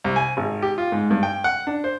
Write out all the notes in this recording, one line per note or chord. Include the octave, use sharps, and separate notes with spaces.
C2
G#5
G#1
G4
F4
G#2
G2
G5
F#5
D4
C5